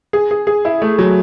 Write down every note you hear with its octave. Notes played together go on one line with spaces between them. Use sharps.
G#4
G#4
G#4
E4
A3
F#3